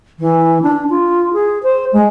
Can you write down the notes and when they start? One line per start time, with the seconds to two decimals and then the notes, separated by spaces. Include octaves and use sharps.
0.19 E3
0.62 D4
0.89 F4
1.33 G#4
1.63 C5
1.92 G#3